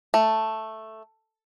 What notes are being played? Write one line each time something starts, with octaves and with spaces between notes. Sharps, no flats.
A3